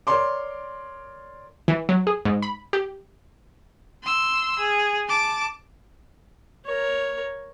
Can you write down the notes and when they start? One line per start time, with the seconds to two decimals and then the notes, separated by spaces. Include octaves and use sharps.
0.07 A#4 C#5 D5 C6 D6
1.68 E3
1.89 F#3
2.07 G#4
2.25 G#2
2.42 B5
2.73 G4
4.03 C6 E6
4.59 G#4
5.08 A5 D6
6.65 A#4 C#5